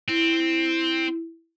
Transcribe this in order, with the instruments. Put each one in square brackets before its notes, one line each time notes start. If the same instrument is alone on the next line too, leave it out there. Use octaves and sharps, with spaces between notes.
[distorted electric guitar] C4 [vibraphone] E4